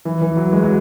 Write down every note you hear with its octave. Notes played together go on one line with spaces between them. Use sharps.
E3
E3
F#3
G#3
F#3